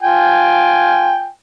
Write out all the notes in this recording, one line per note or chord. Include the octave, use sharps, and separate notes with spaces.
F4 G5 G#5